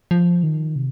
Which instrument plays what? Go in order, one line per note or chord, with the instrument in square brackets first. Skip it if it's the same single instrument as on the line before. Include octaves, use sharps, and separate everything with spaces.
[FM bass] F3
D#3
C3